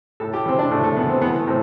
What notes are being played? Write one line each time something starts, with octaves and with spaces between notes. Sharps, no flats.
A2 A4
G4
E3 C4
D4
A2 A3
A3
E3 B3
C4
E3 B3
A3
A2 C4